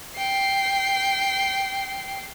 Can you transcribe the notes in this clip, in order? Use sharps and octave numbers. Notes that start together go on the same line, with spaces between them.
G5 C7